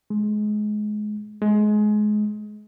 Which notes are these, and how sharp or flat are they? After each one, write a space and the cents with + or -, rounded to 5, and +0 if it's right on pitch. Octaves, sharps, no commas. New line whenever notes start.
G#3 +25
G#3 +25